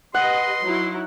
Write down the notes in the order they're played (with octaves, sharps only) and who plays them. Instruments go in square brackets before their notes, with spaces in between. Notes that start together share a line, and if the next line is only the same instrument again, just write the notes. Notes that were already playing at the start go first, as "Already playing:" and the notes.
[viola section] G4 B4 D#5 [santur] F#5 [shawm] C6
[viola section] F#3 D#4 E4